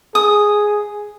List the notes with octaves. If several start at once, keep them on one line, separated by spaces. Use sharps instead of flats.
G#4 D#6